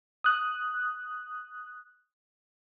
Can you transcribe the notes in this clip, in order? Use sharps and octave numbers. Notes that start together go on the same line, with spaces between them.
D#6 F#6